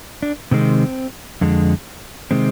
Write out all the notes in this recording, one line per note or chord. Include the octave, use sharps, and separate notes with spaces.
D4
C3 D#3 G#3 C4
F2 D3 G#3
C3 D#3 G#3 C4